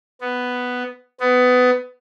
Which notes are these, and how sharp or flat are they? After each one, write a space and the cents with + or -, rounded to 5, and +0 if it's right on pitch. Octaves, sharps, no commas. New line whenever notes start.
B3 +5
B3 +20